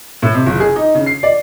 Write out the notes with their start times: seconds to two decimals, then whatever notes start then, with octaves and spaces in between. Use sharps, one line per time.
0.22 A2
0.34 C3
0.47 F#1
0.60 G#4
0.76 D#4
0.95 C#3
1.06 C7
1.23 D5